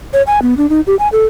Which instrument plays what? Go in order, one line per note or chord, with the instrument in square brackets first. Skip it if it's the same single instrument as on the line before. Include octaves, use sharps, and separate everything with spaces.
[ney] C#5
G#5
B3
D4
D#4
G4
G#5
A4